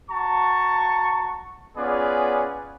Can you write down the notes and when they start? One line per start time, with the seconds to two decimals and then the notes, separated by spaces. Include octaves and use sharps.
0.10 F#4 A5 A#5 C#6
1.77 B3 C#4 F4 G#4 B4 D5